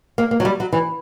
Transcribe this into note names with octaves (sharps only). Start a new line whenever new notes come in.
A#3
A#3
F#3
G3
F#3
E3